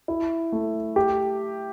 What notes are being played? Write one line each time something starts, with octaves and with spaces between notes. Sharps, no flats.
E4
A3
G4